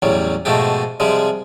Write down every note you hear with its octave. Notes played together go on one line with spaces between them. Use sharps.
A1 E2 F#3 G3
G#2 B2 F3 A3 F#4 G4
C3 F3 G3 G#3